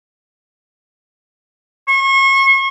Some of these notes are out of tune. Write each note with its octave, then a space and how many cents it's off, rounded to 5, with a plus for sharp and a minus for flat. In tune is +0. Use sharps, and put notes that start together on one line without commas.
C#6 -35